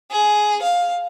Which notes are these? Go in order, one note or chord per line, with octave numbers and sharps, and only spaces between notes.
G#4
F5